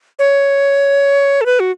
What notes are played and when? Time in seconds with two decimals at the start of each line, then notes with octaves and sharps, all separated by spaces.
0.19 C#5
1.41 A4
1.46 B4
1.60 F#4